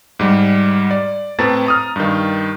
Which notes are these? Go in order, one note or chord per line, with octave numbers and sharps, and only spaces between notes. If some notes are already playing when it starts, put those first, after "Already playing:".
G#2 G3
D5
A2 C4 B4 A5 A#5 A6
A#5 D#6 F6
G2 D#3